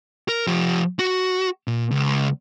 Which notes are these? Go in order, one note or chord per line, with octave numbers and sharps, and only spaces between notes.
A#4
F3 G4
F#4
A#2
C#2